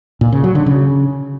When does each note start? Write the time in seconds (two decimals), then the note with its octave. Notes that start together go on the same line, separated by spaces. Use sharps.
0.21 A#2
0.32 C#3
0.44 F#3
0.55 D3
0.66 C#3